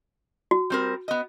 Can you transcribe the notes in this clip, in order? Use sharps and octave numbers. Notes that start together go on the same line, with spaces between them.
F#4
G3 C4 A#4
B3 D#5